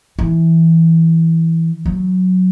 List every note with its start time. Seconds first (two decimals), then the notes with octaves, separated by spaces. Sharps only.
0.19 E3
1.86 F#3